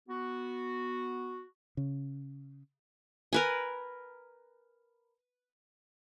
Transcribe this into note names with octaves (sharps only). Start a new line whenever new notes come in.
B3 F#4
C#3
A#4 B4 G#5